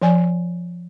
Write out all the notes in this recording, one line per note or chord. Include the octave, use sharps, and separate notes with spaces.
F3 D5 G#5